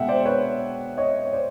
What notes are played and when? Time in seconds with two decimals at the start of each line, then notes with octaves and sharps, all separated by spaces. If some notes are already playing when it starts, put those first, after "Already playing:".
Already playing: B2 G#3 E5 F#5 G5
0.08 C5 D5
0.25 B4 C#5
0.97 C#5 D#5
1.25 C#5
1.33 C5 D5